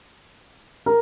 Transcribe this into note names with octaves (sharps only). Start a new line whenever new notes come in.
A#4